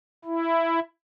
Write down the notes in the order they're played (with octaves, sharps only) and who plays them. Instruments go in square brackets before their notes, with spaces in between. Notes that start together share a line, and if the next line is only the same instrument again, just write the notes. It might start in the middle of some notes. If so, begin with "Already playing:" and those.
[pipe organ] E4